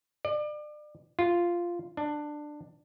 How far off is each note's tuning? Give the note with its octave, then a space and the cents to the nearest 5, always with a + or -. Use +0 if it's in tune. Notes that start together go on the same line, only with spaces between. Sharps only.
D5 +35
F4 -5
D4 +15